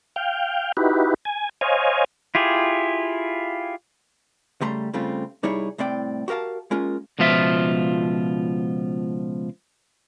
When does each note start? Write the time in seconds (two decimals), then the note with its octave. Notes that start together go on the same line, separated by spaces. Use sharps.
0.16 F5 G5
0.77 D#4 E4 F#4 G4 B4
1.25 G#5
1.61 C5 C#5 D#5 F5 G#5
2.35 E4 F4 G4 G#4
4.61 C#3 G3 A3 A#5 C6
4.93 C#3 G3 A3 C4 F4
5.43 C2 G3 D#4 E4 G#4 C#5
5.78 C2 A2 C4 D5 G5
6.28 F#4 G4 A#4 F5 A5
6.71 G#3 A#3 C#4 F4 A#4
7.19 C#2 B2 F3 F4 E5 F5